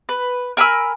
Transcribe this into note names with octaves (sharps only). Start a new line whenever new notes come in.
B4
A#4 G#5 B5 E6